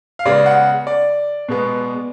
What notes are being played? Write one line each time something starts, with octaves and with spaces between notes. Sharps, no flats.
F5
C#3 G#3 B3 D5
F#5
D5
B2 G#3 B3